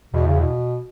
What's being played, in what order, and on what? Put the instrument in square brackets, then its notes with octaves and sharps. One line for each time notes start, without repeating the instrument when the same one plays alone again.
[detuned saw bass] E2 [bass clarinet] B2
[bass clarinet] C#3
B2